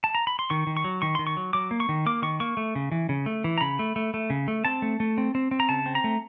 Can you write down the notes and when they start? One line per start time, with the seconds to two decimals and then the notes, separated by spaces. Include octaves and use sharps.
0.04 A5
0.15 A#5
0.27 B5
0.39 C6
0.50 D#3 C#6
0.67 D#3
0.77 C#6
0.84 F#3
1.02 D#3 C#6
1.15 D#3 C6
1.27 C#6
1.37 F#3
1.53 F#3 D6
1.71 A#3
1.80 C#6
1.89 D#3
2.06 A#3 D6
2.22 D#3 C#6
2.40 A#3 C#6
2.57 A3
2.75 C#3
2.92 E3
3.09 C#3
3.26 A3
3.44 E3
3.58 A#5
3.61 C#3 B5
3.79 A3
3.96 A3
4.14 A3
4.30 C#3
4.48 A3
4.65 C4 A5
4.82 A3
5.00 A3
5.18 C4
5.35 C4
5.51 C4
5.60 A#5
5.69 C#3 A5
5.86 C4
5.95 A#5
6.04 A3